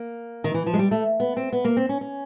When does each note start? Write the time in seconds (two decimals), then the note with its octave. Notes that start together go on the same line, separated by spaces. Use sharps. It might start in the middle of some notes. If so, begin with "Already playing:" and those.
Already playing: A#3
0.44 D#3
0.54 E3
0.66 F3
0.73 G#3
0.79 G3
0.91 A3
1.20 B3
1.37 C4
1.52 B3
1.65 A#3
1.77 C4
1.89 C#4
2.01 C#4